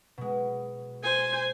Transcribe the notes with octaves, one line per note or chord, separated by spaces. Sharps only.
B2 G#3
C5 G#5